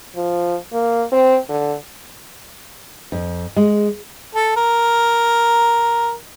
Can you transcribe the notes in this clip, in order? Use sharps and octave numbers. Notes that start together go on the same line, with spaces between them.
F3
A#3
C4
D3
F2
G#3
A4
A#4